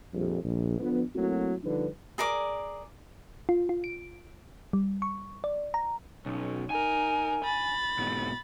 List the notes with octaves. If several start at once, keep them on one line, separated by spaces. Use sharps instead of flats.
A#1 F2 G3
A#1
D3 F3 B3
F#3 A3 A#3 C4 E4 F#4
D3 F3 G3 D4 D#4 B4
G#4 A#4 D5 D6
F4
F4
D7
G3
C#6
D5
A#5
B1 C#4
D#4 A#4 G#5
B5 A6
G#2 B2